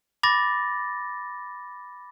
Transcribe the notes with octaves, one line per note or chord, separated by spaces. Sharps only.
B5 D6 A6 A#6